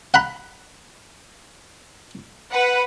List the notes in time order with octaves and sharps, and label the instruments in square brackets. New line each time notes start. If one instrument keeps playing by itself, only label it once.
[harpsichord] F#5 A#5 B5
[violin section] B4 F#5